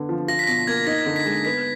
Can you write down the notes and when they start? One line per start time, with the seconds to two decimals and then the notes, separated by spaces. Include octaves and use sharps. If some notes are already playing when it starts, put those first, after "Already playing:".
Already playing: D3 B3
0.09 F3
0.28 F4 A#6
0.39 B6
0.47 B2 A#6
0.67 A#3 G#6
0.87 D#4 A#6
1.06 D3
1.16 B6
1.25 G#3
1.45 B3 B6